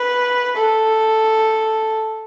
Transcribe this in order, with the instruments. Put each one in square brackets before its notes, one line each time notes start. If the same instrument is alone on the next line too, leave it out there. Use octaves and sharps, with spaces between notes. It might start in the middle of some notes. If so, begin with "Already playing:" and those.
Already playing: [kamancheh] B4
A4